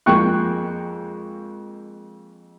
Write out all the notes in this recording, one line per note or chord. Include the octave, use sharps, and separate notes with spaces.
F2 G#3 A#3 G5 C#6 F#6